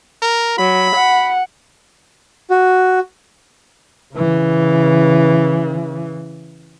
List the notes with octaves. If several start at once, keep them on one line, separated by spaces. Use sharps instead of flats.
A#4
F#3 B5
F#5
F#4
C#3 E3